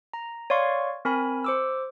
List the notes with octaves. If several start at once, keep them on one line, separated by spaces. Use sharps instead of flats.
A#5
C#5 D5 F5 C6 C#6
C4 A#4 G#5 B5
C5 D6 E6